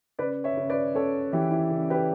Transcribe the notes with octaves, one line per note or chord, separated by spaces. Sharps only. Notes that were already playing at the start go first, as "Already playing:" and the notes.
C#3 B4 D5
C#5 E5
C#3
B4 D5
C#3 A4 C#5
E3 E4 G4
E4
C#3
G4 B4